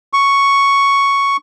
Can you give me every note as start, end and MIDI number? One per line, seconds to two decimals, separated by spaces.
0.13 1.37 85